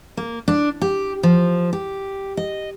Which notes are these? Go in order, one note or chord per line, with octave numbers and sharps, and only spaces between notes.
A#3
D4
G4
F3
G4
D#5